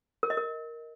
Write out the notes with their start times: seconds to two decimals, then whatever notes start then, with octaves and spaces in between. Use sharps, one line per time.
0.23 A#4
0.30 D#5
0.37 A#4